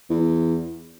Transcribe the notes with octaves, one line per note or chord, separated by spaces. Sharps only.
E2